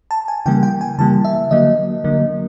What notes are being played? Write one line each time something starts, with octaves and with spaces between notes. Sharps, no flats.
A5
G#5
C#3 E3 G3 A#3 G5
G5
G#5
C#3 E3 G3 A#3 A5
E5
D3 F#3 A#3 D#5
D3 F#3 A#3